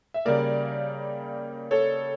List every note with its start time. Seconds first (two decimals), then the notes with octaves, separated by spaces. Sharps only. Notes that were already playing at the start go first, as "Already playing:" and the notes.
0.14 E5
0.25 C#3 G3 A#3 A#4 D5
1.71 A4 C#5